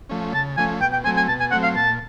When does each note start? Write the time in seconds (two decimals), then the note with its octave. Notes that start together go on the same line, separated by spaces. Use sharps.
0.09 F3 A3 C#4
0.33 C#3 A5
0.57 F3 A3 C#4 G#5
0.80 B2 G5
0.93 G5
1.04 F#3 A3 C4 G#5
1.17 G#5
1.28 B2 A5
1.40 G#5
1.51 F#3 A3 C4 F#5
1.63 F5
1.75 A#2 A5